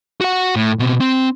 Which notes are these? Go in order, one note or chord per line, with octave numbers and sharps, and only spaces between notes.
F#4 F#5
A2
B2 C4
C4